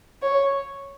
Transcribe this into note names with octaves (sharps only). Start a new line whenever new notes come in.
C#5